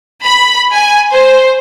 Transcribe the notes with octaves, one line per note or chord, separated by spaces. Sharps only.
B5
G#5
C5